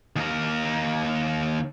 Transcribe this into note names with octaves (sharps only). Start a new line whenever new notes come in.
D#2 A#4